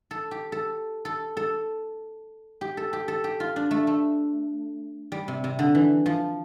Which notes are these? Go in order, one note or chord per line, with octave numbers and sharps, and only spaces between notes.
A4
G4
A4
A4
A4
G4
A4
G4
A4
G4
F4
D4
A3
A3
G3
C3
C3
D3
E3
F3